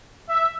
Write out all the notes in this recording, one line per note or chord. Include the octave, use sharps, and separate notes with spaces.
E5